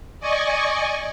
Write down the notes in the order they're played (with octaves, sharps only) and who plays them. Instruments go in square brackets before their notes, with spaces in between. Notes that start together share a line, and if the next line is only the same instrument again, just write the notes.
[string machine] D5 D#5 G#5 C#6